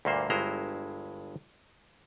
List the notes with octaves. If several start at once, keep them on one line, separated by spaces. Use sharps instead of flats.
D2 G2 A#2 A#3 C5
G1 G2 G#3 E4 C5 A#5